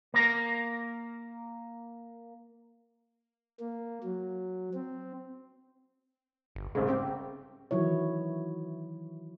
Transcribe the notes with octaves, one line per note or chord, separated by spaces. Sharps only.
A#3 A#4
A#3
F#3
C4
G1
C2 G#2 C#3 G#3
C4 G4
D#3 E3 F#3 E4 C#5